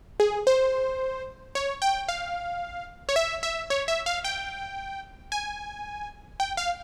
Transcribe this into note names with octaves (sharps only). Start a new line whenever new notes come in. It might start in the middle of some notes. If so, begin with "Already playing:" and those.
G#4
C5
C#5
G5
F5
C#5
E5
E5
C#5
E5
F5
G5
G#5
G5
F5